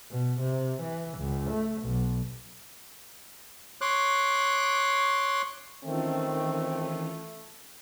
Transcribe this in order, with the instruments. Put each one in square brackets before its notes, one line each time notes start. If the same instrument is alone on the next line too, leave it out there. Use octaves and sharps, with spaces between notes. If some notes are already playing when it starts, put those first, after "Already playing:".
[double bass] B2
C3
E3
C#2
A3
B1
[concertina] C#5 C6 D6 F#6
[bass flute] D#3 [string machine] E3 C#4 F4 [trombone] A3 [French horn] C4